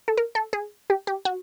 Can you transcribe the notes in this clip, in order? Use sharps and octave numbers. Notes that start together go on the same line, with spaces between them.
A4
A#4
A4
G#4
G4
G4
F#4